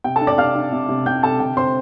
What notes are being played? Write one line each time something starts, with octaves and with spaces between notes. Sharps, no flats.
C3 G5
A4 A5
D4
D5 D6
C3 F5 F6
D4
C3
C3
C3 G5 G6
C3 A4 A5
D3 G5
C4 C5 C6